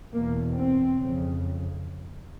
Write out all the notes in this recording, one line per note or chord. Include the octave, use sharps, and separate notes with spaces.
E2 B2 A#3
C4
F2 C#3